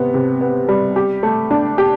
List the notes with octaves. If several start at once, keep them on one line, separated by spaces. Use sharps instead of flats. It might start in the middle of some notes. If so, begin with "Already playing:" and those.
Already playing: C3 B3
C3
B3
G3
G4
A3
D4
G4